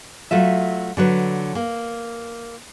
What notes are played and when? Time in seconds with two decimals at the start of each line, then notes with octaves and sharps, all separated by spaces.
0.31 F#3 A3 F4 E5
0.97 D3 F#3 B4
1.55 A#3